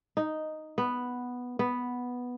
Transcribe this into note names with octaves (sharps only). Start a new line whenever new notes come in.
D#4
B3
B3